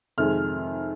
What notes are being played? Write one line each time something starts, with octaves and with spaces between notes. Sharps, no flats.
F2 C3 D#3 G#3 F6